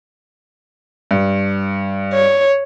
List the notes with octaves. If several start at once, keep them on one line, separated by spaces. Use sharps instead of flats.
G2
C#5